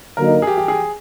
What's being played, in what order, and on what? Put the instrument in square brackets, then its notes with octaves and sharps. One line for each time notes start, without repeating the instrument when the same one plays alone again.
[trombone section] D3 F#3 A#3 D#4 [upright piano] A#4
[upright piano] G#4
G4
G4
G#4